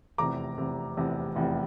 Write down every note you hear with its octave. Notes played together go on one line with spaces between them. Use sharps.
F1 E2 C3 A#5 D6
F1 E2 C3
F1 E2 C3
F1 E2 C3